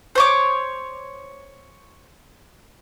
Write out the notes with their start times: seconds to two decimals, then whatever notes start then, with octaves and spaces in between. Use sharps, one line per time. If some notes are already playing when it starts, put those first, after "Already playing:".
0.15 C5 C#5 D6